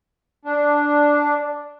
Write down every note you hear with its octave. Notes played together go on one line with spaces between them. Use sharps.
D4